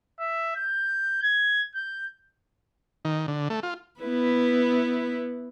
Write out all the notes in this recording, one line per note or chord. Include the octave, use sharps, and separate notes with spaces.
E5
G6
G#6
G6
D#3
D3
A3
F4
B3 E4 B4